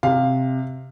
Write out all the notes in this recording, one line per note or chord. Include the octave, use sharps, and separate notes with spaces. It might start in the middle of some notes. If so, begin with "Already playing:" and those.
C3 F5